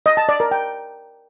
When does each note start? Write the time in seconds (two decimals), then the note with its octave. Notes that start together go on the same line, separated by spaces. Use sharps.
0.06 D#5
0.17 A5
0.29 D5
0.40 A#4
0.51 G5